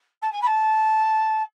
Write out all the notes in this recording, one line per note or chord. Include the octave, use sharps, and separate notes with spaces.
A5
G#5
B5
A5